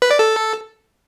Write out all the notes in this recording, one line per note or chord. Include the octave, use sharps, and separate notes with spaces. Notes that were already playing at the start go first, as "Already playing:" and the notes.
B4
D5
A4